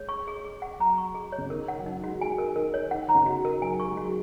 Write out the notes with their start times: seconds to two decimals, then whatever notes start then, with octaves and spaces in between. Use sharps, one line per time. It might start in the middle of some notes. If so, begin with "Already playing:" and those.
Already playing: G#3 C#5
0.09 C#6
0.27 G#4
0.45 G#4
0.62 F#5
0.79 F#3 A#5
0.98 C#6
1.15 G#4
1.32 C#5
1.38 C#3
1.50 D#3 A#4
1.68 F#5
1.79 F#3
1.85 D#3 D#4
2.03 G#3 F#4
2.20 G#3 G#5
2.38 A#4
2.56 D#3 A#4
2.74 C#5
2.91 D#3 F#5
3.08 D#3 A#5
3.15 C#3
3.26 F#4
3.45 A#4
3.62 F#3 G#5
3.80 C#6
3.87 G#3
3.97 F#3 F#4